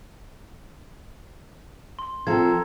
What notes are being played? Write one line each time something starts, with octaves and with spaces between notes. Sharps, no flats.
C6
F3 C4 A4 A#4 G#6